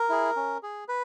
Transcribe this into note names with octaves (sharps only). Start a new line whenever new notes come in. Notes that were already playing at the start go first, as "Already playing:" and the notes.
Already playing: A#4
E4 G#4
C#4
G#4
B4